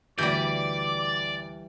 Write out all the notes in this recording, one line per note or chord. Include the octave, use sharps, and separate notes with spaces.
D2 E3 G3 D5 D6 G6